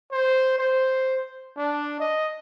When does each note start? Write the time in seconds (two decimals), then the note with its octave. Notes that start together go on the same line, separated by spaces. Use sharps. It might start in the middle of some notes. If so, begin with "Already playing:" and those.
0.12 C5
0.58 C5
1.57 D4
2.00 D#5